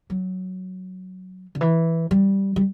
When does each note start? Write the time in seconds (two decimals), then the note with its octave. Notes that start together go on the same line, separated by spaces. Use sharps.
0.10 F#3
1.55 D3
1.61 E3
2.11 G3
2.56 G3